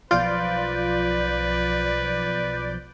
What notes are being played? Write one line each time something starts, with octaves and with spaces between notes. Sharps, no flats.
B1 F3 F4 B4 D5 G6